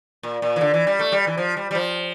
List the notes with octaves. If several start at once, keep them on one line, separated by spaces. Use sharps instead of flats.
A#2
A#2
E3
D3
E3
G3
A3
G3
E3
F3
G3
G3
F3